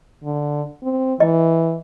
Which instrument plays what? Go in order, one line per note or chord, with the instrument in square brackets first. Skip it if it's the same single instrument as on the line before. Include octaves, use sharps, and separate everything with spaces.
[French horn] D3
C4
[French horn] E3 [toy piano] D#5